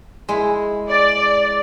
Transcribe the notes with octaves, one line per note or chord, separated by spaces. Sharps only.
G#3 E4
D5